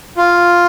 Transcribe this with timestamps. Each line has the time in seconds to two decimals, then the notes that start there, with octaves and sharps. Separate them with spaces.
0.18 F4